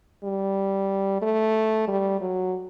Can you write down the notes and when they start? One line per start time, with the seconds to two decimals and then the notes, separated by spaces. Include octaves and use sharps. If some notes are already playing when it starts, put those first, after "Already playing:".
0.24 G3
1.22 A3
1.88 G3
2.21 F#3